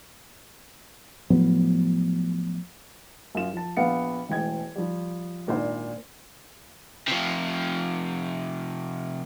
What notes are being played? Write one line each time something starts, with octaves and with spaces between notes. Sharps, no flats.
A2 F3 F#3 B3
F#2 F4 E7
F3 A5
A#1 B3 F5 C#7
E1 A1 G#3 G5 G#6
F3 G3
G#1 A#2 D4 C5
C3 F3